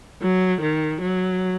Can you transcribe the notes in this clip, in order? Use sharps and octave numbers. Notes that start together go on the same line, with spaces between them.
F#3
D#3
F#3